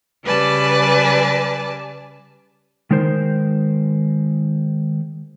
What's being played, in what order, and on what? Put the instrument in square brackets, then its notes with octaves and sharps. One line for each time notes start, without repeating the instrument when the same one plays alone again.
[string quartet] C#3 G3 B4 D5 G#5 A5
[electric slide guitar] D#3 G#3 D#4 A#4 C5